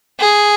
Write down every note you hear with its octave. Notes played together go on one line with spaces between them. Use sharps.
G#4